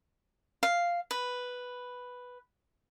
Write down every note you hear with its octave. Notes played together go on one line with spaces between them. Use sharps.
F5
B4